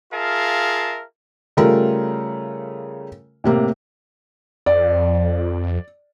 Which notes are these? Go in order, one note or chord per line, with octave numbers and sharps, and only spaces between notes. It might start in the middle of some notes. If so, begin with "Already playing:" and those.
F4 G#4 A#4 E5 F5 A5
C#3 G3 A3 F4 A#4
A2 C3 A#3
F2 D5